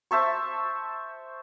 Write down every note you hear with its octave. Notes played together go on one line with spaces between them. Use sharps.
C5 E5 A5 C#6